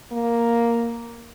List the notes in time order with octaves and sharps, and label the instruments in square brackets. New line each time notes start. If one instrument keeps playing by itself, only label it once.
[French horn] A#3